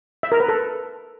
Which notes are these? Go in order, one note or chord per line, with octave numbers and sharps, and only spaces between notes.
E5
A#4
B4
A4